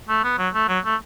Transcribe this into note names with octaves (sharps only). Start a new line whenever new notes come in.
A3
B3
F#3
A3
F#3
A3